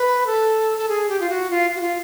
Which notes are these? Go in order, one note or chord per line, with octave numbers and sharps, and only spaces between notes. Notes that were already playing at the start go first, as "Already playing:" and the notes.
Already playing: B4
A4
A4
G#4
G4
F4
F#4
F4
F#4
F4